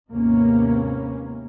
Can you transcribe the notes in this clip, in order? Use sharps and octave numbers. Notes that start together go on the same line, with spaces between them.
D#2 G#2 C3 A#3 B3 C#4